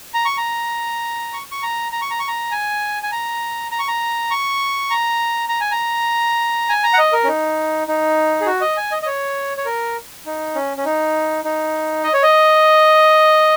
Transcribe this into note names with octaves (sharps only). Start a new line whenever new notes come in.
A#5
C#6
A#5
C#6
C#6
A#5
A#5
C#6
A#5
C#6
A#5
G#5
G#5
A#5
A#5
C#6
A#5
C#6
A#5
A#5
G#5
A#5
G#5
A#5
F#5
D#5
A#4
C#4
D#4
D#4
G#4
F#4
D#5
G#5
D#5
D#5
C#5
C#5
A#4
D#4
C#4
C#4
D#4
D#4
D#5
C#5
D#5